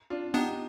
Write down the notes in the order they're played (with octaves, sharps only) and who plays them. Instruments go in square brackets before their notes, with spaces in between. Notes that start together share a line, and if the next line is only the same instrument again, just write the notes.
[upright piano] D4 F4
[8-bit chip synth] B3 D4 [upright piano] D#4 G4